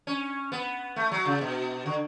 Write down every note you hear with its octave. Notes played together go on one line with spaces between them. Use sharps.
C#4
B3
A3
F#3
C#3
B2
D3